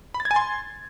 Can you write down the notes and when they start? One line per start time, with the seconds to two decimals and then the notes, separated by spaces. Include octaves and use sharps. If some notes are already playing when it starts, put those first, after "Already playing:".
0.14 B5
0.20 A6
0.25 G#6
0.31 G#5
0.36 C6